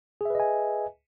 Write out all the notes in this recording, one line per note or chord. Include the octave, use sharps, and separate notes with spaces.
G#4 B4 D#5 E5 G#5